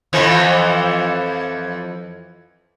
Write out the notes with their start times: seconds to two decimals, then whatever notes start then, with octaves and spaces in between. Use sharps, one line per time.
0.13 F2 E3 F3